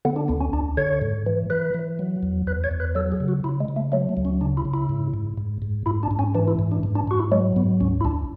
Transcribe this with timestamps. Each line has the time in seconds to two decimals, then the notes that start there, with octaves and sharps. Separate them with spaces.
0.05 D3 B3
0.16 D4
0.28 D2 B3
0.41 C#4
0.53 D2 D4
0.77 D3 C#5
1.01 G#2
1.26 E3
1.50 E3 B4
1.74 E3
1.99 F#3
2.23 E2
2.47 E2 B4
2.64 C#5
2.71 E2
2.80 B4
2.95 F#3 A4
3.12 G#4
3.20 C#3
3.28 F#4
3.44 C#3 E4
3.60 G#3
3.68 C#3
3.76 A3
3.92 F#3 A3
4.09 A3
4.17 D2
4.25 C#4
4.41 C#3 D4
4.57 E4
4.65 C#3
4.74 E4
4.89 G#2
5.14 G#2
5.37 G#2
5.62 G#2
5.86 G#2 E4
6.03 D4
6.11 G#2
6.19 C#4
6.35 E3 D4
6.48 E4
6.59 G#2
6.72 D4
6.83 G#2
6.95 D4
7.07 G#2 F#4
7.19 E4
7.32 F#3 G#3
7.56 G#2 B3
7.80 D2 C#4
8.01 E4
8.05 D2 D4